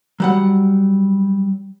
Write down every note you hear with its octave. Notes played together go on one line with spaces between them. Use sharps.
F#3 G3 F#5